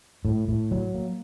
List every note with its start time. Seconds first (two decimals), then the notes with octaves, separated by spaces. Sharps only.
0.25 A2
0.48 A2
0.71 F#3
0.94 A#3